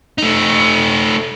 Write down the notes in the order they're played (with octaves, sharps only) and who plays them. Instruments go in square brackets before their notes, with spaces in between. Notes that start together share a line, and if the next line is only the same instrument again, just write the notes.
[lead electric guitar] A3 D#4